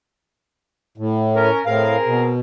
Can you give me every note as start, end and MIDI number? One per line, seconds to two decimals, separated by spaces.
0.98 1.50 45
1.35 1.61 61
1.35 1.61 70
1.66 1.96 45
1.66 2.32 60
1.66 2.32 68
1.66 2.32 70
1.66 1.96 77
2.06 2.40 47